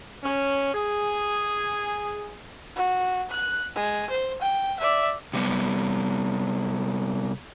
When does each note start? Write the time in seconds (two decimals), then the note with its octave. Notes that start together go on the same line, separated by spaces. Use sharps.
0.24 C#4
0.75 G#4
2.76 F#4
3.31 F#6
3.75 G#3
4.10 C5
4.41 G5
4.80 D5 E5
5.33 C3 G3 B3